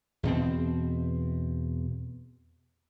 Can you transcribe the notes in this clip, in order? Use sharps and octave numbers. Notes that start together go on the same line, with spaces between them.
E2 B2 C4